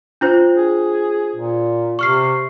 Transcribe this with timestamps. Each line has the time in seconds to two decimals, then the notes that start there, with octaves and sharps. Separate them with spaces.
0.21 D4 F4 C5
0.56 G#4
1.36 A#2
1.99 C3 C#6 F6 C7